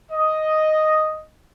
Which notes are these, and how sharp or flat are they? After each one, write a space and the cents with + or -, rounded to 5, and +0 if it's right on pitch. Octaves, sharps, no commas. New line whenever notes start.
D#5 +0